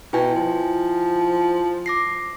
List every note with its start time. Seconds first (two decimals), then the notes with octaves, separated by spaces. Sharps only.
0.13 B2 E4 G5 G#5
0.35 F3
1.86 D6 A#6 C7